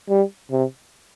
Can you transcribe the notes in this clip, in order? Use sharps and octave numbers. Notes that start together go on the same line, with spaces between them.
G3
C3